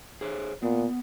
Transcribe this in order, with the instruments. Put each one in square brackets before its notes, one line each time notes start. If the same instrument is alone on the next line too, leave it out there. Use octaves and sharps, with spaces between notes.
[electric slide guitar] G#4 C5 C#5
[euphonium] A#2 [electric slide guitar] B3